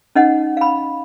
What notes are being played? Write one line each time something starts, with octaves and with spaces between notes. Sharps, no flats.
C#4 D#4 D#5 F#5
F5 B5